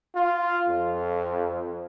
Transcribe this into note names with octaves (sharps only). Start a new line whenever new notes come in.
F4
F2